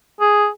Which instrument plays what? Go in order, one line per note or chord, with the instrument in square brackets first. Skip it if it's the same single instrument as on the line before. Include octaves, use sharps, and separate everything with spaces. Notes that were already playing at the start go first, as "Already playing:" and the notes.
[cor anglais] G#4